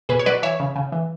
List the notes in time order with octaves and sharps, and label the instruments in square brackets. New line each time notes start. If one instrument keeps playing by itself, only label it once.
[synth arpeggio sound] B2 G#4 B4
C#5
F#3 B4 D5
E3 C#5 E5
C#3
C#3
E3